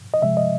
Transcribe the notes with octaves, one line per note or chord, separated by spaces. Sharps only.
D#5
C3 F3 G#3 E5
D#5